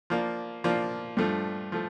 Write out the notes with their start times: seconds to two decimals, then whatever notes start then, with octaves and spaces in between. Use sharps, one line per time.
0.10 F3 A#3 D4
0.64 F3 A#3 D4
1.17 G2 F3 A3
1.72 F3 A3